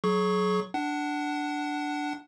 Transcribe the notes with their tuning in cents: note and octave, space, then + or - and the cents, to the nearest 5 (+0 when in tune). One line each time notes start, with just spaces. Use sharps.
F#3 +0 G#4 +35 C#6 +0
D4 +0 F#5 +25